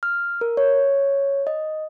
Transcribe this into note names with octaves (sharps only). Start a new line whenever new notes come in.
F6
A#4
C#5
D#5